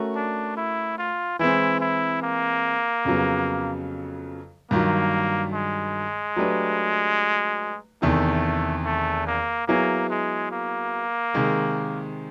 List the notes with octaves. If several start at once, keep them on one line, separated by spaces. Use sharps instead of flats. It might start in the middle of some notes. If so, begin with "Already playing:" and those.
Already playing: A3 C#4 F#4 A#4
D4
E4
F4
E3 G#3 C4 E4
E4
A#3
F2 C#3 F#3 B3
G2 D#3 F#3 A#3
G#3
F#3 A3 D4 G4 B4
E2 C3 D#3 A3
A3
A#3
F#3 A#3 B3 E4 G#4 C#5
G#3
A#3
C3 D#3 G#3